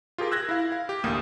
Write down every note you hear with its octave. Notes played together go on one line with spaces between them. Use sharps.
F4 G4 G#4 A#4
E6 F#6 G#6 A#6
E4 F5
F5
G4
A1 D2 A#3 D#6